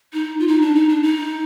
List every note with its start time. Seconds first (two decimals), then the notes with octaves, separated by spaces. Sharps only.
0.13 D#4
0.40 F4
0.48 D#4
0.61 D4
0.75 D#4
0.89 D4
1.03 D#4